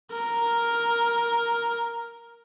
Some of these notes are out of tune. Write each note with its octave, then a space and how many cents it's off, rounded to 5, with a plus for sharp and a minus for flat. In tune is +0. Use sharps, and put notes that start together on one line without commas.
A#4 +5